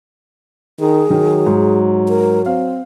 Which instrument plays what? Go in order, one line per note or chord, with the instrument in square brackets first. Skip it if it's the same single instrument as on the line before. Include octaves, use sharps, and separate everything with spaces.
[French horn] D#3 [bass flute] G#4
[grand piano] D#3 [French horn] F#3
[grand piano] G#2
[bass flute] A#4
[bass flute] C4 [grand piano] F5